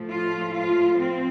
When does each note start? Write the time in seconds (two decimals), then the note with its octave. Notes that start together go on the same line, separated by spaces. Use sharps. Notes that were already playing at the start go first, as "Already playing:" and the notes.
Already playing: A2 F3 A3
0.10 F4
0.55 F4
1.00 C4